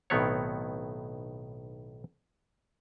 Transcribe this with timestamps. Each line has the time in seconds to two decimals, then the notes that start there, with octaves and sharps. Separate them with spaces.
0.10 B1 A2 D#3 B3 C4 C#5